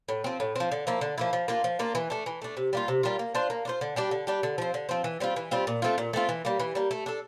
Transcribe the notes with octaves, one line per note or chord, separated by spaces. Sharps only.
A2
F3 C4
A2
F3 C4
D3
F3 A#3 E4
D3
F3 A#3 E4
F3
A#3 D4 F4
F3
A#3 D4 F4
E3
A3 D4
E3
A3 D4
C3
G3 A#3 F4
C3
G3 A#3 F4
A#3
D4 F4 C5
A#3
D4 F4 C5
D3
G3 D4 G4
D3
G3 D4 G4
D3
F3 C4
D3
F3 C4
E3
G3 C4 F4
E3
G3 C4 F4
A#2
A3 C4 F4
A#2
A3 C4 F4
E3
G3 A#3
E3
G3 A#3
A3
D4 A4